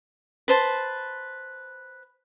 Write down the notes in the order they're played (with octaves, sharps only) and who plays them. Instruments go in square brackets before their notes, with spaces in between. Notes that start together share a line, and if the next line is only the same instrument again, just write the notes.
[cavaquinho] B4 C5 A5